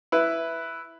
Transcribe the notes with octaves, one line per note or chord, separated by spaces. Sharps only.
E4 B4